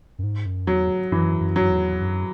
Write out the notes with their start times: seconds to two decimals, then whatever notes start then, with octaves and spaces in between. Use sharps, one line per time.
0.19 F#2
0.23 G#2
0.46 F#2
0.67 E2 F#3
1.12 F#2 E3
1.41 F#2
1.56 F#2 F#3
1.71 E2
2.01 F#2